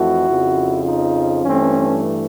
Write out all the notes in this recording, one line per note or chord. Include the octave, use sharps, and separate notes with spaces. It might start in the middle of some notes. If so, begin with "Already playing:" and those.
Already playing: F2 E3 A3 E4 F#4
F2 C#3 F3
D#4 F4
G2 E3 A3 C4 C#4